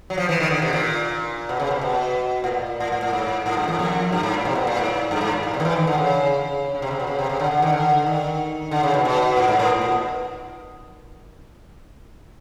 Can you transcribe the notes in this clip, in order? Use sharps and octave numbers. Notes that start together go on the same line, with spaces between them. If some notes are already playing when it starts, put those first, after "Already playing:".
F#3
F3
E3
D#3
D3
C3
A#2
B2
C#3
C3
B2
A2
A#2
A2
A2
A2
G#2
A2
G2
E2
F2
G2
G#2
A#2
C3
B2
A#2
G#2
G2
G#2
A#2
A#2
C3
D#3
E3
D#3
D3
C#3
C#3
C3
C#3
B2
C#3
C3
C#3
D3
D3
D#3
D3
D#3
D3
C#3
B2
B2
A2
G#2
A2
B2